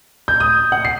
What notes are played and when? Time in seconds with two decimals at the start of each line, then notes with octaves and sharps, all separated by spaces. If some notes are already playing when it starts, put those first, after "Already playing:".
0.28 G6
0.40 D#6
0.72 F#5
0.85 C7